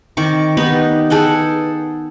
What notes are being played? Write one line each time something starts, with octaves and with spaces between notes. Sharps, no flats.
D#3 C4 C#6 D6
B3 D#4 G4 B4
G#4 A4 F#5 G5